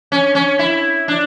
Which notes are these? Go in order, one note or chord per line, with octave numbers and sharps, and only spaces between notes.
C#4
C#4
E4
D4